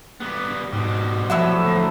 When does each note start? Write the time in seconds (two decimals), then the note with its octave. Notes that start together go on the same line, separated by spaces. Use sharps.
0.20 G3 B3
0.73 G#2 B2 G3
1.30 A2 F3 F#3 E5 F#5 E6
1.65 D2